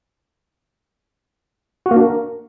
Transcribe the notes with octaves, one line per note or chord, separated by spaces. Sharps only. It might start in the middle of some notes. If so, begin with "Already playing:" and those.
F#4
A#3
D4
A#4